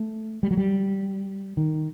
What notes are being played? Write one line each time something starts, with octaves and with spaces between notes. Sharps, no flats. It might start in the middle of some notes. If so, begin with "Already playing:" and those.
Already playing: A3
G3
F#3
G3
D#3